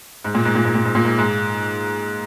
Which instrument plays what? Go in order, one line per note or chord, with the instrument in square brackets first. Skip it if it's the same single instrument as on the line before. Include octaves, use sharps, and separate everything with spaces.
[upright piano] G#2
A#2
G#2
A#2
G#2
A#2
G#2
A#2
G#2
G#2